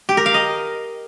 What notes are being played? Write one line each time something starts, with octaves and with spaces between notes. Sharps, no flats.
G4
A#4
F5
D#5